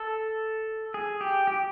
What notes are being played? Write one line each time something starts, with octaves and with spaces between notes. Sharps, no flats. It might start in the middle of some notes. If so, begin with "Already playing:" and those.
Already playing: A4
G#4
G4
G4